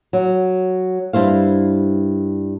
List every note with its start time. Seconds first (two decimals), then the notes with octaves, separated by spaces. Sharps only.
0.13 F#3
1.13 G2 E4 C5 F5